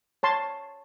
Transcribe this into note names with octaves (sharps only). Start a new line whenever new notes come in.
C#5 A5 C6